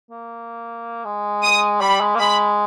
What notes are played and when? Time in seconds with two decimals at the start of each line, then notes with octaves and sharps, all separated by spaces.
0.11 A#3
1.05 G#3
1.43 D#6
1.81 G3 B5
2.01 G#3
2.15 A#3
2.19 G#3 B5